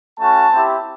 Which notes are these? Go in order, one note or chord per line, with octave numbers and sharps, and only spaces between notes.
A3 C#4 F#4 A5
C4 E4 G4